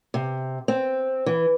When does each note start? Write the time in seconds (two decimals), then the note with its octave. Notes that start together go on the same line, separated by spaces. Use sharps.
0.14 C3
0.68 C4
1.26 E3